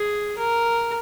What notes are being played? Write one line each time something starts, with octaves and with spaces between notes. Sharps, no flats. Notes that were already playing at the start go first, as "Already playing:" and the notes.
Already playing: G#4
A#4